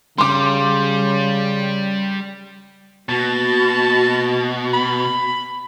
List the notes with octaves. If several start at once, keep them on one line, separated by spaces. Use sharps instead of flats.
C#3 G3 C6 D6
B2 A#3 F#4 A5
B5